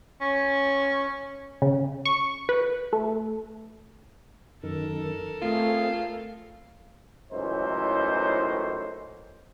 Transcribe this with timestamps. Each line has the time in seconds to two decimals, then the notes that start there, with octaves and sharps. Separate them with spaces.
0.21 C#4
1.62 C#3
2.05 C#6
2.49 B4
2.93 A3
4.63 F#2 D#3 A4 A#4
5.42 A3 C4 F4 G#4
7.31 C#2 F#2 A2 E3 D#4 C5